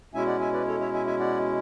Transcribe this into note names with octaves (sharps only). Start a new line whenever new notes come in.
B2 G#3 C#4 E4 E5 G#5
D5 F#5
E5 G#5
B4 D5
A4 C#5
C#5 E5
E5 G#5
E5 G#5
D5 F#5